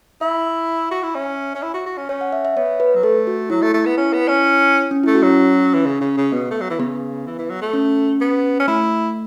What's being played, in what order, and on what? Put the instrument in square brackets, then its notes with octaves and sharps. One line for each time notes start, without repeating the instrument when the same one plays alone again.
[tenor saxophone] E4 [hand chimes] E5
[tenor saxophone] F#4
E4
C#4
C#4
E4
F#4
F#4
C#4
[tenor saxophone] C#4 [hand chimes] C#5
[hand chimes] F#5
E5
E5
[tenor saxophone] B3 [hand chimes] C#5
[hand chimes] B4
[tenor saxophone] F#3
[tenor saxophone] A3 [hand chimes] A4
[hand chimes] F#4
[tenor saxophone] F#3 [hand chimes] E4
[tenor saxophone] A3
A3
B3
[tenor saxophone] C#4 [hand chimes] E4
[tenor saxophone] B3
C#4
[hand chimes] C#4
[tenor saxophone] A3 [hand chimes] E4
[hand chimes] F#4
[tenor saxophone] F#3 [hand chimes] C#4
[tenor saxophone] E3
C#3
C#3
C#3
[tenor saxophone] B2 [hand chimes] B3
[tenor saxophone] A3
F#3
E3
[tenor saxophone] C#3 [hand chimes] B3
[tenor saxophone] E3
E3
F#3
A3
[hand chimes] C#4
[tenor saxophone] B3
C#4
[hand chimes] A3 [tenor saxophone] E4